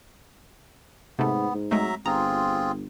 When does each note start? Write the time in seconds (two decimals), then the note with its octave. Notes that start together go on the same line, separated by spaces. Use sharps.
1.19 G#2 C3 A3 B3
1.54 G#2
1.71 F#3 G#3 A3 C4 E5 A#5
2.06 G1 C4 F4 G#4 A#5